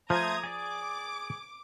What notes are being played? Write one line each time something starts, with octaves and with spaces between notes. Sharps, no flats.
F3 A3 C5 A#5 D#6 G#6
G#4 D5 D6